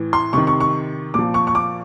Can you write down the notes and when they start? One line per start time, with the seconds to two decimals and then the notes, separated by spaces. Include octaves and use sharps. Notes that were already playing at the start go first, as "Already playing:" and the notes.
Already playing: A2 E3
0.13 C6
0.33 C3 D#3 C#6
0.47 C#6
0.60 C#6
1.14 A#2 F3 D6
1.34 C#6
1.47 C#6
1.55 D6